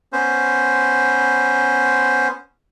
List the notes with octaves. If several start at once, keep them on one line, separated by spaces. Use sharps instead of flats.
B3 C#4 C5